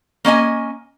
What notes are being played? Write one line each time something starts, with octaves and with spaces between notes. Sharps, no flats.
A#3 C#4 D#5 G#5